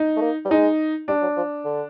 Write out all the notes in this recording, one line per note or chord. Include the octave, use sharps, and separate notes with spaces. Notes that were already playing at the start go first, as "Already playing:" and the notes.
Already playing: D#4
A3
A#3
G3
G#3 D#4
G3 D4
F#3
F3
D3